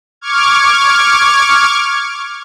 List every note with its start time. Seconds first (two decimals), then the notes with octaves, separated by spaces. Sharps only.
0.21 C#6 D6 F6 G#6